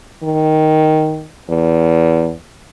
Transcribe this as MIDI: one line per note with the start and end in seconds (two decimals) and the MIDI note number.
0.23 1.26 51
1.49 2.33 40